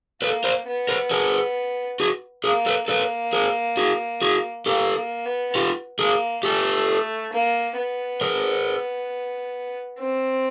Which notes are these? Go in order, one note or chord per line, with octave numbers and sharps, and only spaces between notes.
A#3 A4 B4
A#4 C5
B3
A#4 C5
G#4 A#4
F#4 G#4
A#3 G#4 A#4
A4 B4
A#3 A4 B4
G#4 A#4
F#4 G#4
F#4 G#4
A#3 G4 A4
A#3
B3
F4 G4
A#3 G#4 A#4
A3 G4 A4
A#3
B3
G#4 A#4
C4